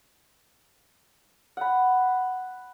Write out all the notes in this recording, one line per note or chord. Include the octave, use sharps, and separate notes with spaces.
F#5 B5